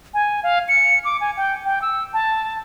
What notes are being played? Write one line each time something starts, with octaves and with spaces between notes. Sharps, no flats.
G#5
F5
C#7
D6
G#5
G5
G5
E6
A5